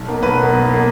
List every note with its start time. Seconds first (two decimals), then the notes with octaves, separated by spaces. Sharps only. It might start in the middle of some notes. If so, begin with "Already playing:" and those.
Already playing: B1
0.08 B2 A#3
0.23 B1 B4
0.38 B2 A#3
0.54 B1
0.69 B2 A#3